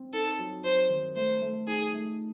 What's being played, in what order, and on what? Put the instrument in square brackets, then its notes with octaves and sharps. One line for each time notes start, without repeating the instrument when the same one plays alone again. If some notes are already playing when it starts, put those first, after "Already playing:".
Already playing: [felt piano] C4
[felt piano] D#4 [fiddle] A4
[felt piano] F#3
[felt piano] F#3 [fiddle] C5
[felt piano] D#3
[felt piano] A3 [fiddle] C5
[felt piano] A3
[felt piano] D#4 [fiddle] G#4
[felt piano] A3